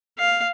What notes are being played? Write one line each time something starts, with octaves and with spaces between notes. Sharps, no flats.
F5